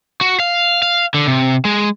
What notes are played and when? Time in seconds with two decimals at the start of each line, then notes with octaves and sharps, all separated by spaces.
0.21 F#4
0.40 F5
0.82 F5
1.14 D3
1.27 C3
1.65 G#3